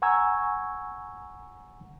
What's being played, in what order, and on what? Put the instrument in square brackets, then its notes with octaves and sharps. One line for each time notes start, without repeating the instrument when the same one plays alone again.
[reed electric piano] F#5 G#5 A#5 C#6 E6 G#6